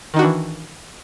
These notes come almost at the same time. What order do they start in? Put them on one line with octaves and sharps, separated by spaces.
D#3 D#4 F#4 D4 E3